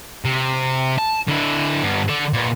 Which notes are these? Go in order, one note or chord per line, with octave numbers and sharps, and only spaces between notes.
C3
A5
D3 E4
G2 B3
D3 A4
A#2 B3